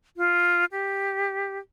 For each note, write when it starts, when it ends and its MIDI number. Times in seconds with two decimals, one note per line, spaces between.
0.17 0.65 65
0.72 1.58 67